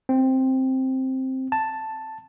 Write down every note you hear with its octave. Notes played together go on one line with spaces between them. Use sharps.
C4
A5